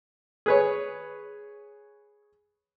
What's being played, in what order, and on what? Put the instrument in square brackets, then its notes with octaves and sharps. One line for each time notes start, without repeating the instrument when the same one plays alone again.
[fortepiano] G#4 B4 C#5